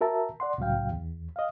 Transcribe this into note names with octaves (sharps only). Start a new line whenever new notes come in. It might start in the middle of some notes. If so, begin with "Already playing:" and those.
F#4 A#4 E5 A5 A#5
D5 F#5 C6
C2 A2 C#3 F#3 F5 G5
E2
D#5 F5